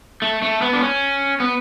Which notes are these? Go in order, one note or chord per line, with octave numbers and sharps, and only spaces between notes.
A3
A3
B3
D4
C#4
B3